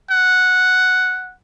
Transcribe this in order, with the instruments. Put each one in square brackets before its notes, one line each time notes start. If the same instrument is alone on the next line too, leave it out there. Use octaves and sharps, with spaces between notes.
[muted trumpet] F#5